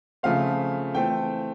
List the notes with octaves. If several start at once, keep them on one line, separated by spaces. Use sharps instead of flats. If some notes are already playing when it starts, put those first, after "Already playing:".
C#3 F3 A3 C4 F5
E3 A3 C4 G5